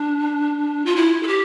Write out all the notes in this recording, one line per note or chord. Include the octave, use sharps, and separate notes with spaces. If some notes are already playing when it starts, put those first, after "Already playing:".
Already playing: D4
F4
E4
A4
G4